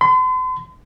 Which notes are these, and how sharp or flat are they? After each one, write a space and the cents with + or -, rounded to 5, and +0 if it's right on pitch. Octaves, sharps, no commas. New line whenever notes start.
C6 -45